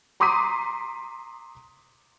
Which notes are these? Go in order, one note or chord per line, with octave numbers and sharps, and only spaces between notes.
A#5 C6 D6 D#6 B6 D#7